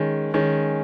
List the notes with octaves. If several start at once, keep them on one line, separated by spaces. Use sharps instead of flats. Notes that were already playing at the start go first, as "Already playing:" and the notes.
Already playing: D#3 G#3 C#4
D#3 G#3 C#4